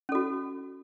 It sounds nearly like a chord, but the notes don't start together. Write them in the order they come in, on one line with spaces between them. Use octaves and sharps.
C#4 A4 F#4